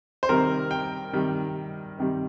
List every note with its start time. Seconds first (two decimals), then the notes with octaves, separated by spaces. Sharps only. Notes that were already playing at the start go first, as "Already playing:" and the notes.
0.23 C5
0.29 C3 D#3 G3 A#4
0.71 G5
1.13 C3 D#3 G3
1.98 C3 D#3 G3